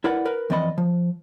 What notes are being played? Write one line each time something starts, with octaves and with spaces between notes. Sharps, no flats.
E4 A#4 B4 D5 F#5
A#4 B4
F2 E3 C4 D5 D#5 B5
F3